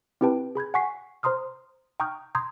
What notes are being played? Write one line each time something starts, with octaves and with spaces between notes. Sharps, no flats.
C4 E4 G4 B4 G5 A5
G#4 B5 G6 G#6
F#5 G#5 C#6 B6 C7
C5 A#5 C6 D#6 F6
G5 A#5 C#6 D#6 F6 G6
A#5 C6 D#6 G6 G#6